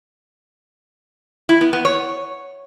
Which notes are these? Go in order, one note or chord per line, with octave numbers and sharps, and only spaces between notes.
E4
B3
B3
C#5